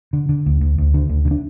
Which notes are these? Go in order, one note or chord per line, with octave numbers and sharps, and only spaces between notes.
D3
D3
D2
D2
D2
D3
D2
D3
D4